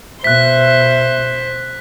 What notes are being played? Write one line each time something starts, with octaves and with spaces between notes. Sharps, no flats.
B2 C5 E5 F#6 B6